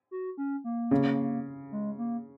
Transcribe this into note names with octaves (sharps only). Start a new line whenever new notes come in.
F#4
C#4
A#3
C#3
G#3
A#3